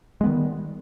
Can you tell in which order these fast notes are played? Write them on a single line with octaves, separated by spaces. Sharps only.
G#3 B3 D#3 G3